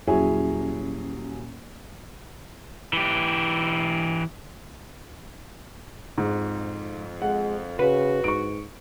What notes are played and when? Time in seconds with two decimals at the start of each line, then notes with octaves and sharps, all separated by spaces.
0.07 D#1 F#3 C#4 E4 G#4 G#5
2.93 E3 G4
6.18 F2 G#2
7.22 G#3 F#5
7.79 C#3 F#4 B4
8.24 G#2 C#6 D7